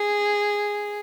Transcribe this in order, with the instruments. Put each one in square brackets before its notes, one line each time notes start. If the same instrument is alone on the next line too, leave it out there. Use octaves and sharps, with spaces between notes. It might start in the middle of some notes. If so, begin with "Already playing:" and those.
Already playing: [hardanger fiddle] G#4